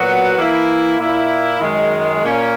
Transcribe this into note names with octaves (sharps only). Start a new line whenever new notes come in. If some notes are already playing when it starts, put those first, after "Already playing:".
Already playing: A#2 F#3 B3 F#4
E3 A#3 E4
A#2 A#3 E4
F#2 D#3 G#3
A#2 A#3 C#4